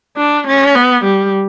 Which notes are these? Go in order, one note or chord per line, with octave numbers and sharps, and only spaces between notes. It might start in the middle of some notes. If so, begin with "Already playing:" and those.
D4
C#4
B3
G3